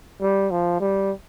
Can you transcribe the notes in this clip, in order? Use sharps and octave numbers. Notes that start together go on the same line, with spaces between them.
G3
F3
G3